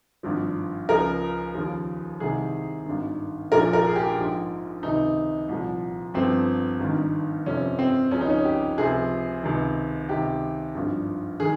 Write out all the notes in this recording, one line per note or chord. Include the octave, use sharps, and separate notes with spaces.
G#1 G2 F3
C#2 C#3 F3 A#4
D#2 C#3 F3
C2 C3 D#3 G#4
G#1 G2 D#3
A#1 A#2 F3 A#4
A#4
G#4
G4
A#1 G#2 F3
C#2 C3 D#3 D#4
C2 A#2 F3
G1 G2 F3 C4
G#1 G2 D#3
G1 F2 C3 F3 C#4
C4
C#2 C#3 F3 C#4
D#4
C#4
G4
C#2 C3 F3 G#4
C#2 C3 D#3
C#2 C3 D#3 G4
G#1 G2 F3
D#3 G#4